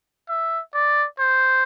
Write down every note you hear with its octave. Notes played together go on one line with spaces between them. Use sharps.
E5
D5
C5